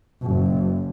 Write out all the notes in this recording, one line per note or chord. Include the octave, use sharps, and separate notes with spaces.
F#1